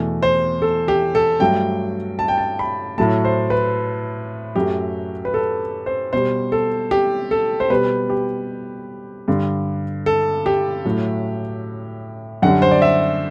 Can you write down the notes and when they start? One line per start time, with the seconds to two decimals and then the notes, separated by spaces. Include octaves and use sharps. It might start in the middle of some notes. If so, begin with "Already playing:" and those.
Already playing: E2 B2 A3
0.23 C5
0.62 A4
0.88 G4
1.15 A4
1.40 G2 F#3 A3 G5
2.19 A5
2.28 G5
2.38 A5
2.59 B5
2.98 A2 F#3 A3 A5
3.25 C5
3.50 B4
4.56 F#2 F#3 A3 G4
5.25 B4
5.34 A4
5.86 C5
6.13 B2 G3 C5
6.52 A4
6.91 G4
7.31 A4
7.60 C5
7.70 B2 G3 B4
8.10 G4
9.28 G2 D3 G3
10.06 A4
10.46 G4
10.85 A2 F#3 A3
12.42 F#2 D3 G3 F#5
12.62 C5
12.71 D5
12.82 E5